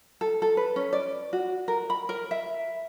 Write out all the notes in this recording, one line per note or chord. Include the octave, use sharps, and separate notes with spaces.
A4
A4
B4
C#4
D5
F#4
A#4
B5
A#4
E5